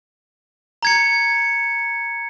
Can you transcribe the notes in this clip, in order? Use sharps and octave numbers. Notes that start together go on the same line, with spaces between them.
A#5 G#6 C#7